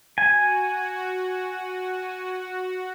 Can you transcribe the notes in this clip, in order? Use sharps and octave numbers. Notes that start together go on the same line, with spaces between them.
F#4 G#5